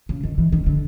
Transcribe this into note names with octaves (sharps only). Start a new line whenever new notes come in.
C#3
D#3
E3
D#3
D3